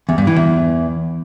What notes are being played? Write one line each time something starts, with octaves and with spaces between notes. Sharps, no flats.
E2
G2
E3
E2